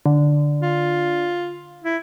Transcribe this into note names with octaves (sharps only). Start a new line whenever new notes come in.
D3
F4
E4